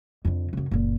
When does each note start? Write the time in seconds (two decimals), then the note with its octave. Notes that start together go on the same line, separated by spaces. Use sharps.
0.25 F2 D3
0.53 F#2 C#3
0.71 F#1 A#2